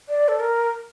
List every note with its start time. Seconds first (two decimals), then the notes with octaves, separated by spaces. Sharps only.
0.09 D5
0.28 A4
0.40 A#4